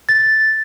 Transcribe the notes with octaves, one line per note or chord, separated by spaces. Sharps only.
A6